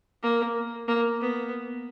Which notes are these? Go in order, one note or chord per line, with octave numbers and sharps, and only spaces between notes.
A#3
A#3
B3